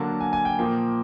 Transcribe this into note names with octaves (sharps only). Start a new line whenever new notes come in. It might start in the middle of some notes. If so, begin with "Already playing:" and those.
Already playing: D3 F#3 A#3 A5
G#5
G#5
G5
A#2 F3 A#3